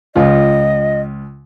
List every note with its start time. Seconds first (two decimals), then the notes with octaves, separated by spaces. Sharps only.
0.16 C#2 F4 D#5